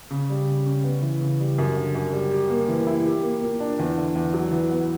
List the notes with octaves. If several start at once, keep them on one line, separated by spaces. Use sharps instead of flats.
C#3
G3
C#3
C#4
B3
E3
C#3
G3
F#2
D3
F#2
G3
G4
A#3
E3
E4
G4
A#3
A#2
D4
E2
D3
E2
F#3
E3
B3